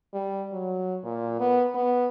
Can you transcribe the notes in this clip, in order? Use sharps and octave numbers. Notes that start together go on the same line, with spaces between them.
G3
F#3
A#2
B3
B3